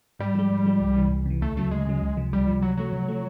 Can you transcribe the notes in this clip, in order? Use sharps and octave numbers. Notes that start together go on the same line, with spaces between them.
G#2 G3
F3 G#3
G#2
F3 G#3
C2
C3 E3
C2
C3 E3
D2 A3
C#3 F#3 A3
D2 G#3
C#3 F#3
C#2
C3 F3
C#2 G3
C3 F3
C3 F#3
F3 F#3 A3
C3
F3 A3